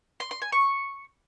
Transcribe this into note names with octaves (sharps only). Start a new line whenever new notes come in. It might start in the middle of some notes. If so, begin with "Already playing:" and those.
C6
C6
G#5
C#6